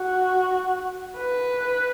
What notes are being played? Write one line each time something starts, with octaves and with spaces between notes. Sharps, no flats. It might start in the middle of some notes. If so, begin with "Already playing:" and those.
Already playing: F#4
B4